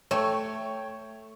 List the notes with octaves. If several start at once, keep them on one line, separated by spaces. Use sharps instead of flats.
A3 C#5 G5 C#6